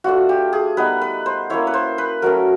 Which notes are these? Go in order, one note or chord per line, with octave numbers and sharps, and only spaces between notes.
A3 D4 F4 F#4
G4
G#4
G3 B3 D#4 B4
B4
C5
A#3 C#4 E4 C#5
B4
C5
B4
F#3 A3 C#4 A#4